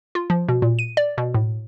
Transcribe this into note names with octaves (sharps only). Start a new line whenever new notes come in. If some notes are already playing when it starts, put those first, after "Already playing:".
F4
F3
B2
A#2
D#7
D5
B2
A2